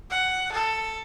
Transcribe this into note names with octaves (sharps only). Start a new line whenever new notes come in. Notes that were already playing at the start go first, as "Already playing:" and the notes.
F#5
A4